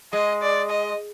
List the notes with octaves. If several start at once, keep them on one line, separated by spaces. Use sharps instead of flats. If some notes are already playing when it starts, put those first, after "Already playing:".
G#3 D#5
D5
D#5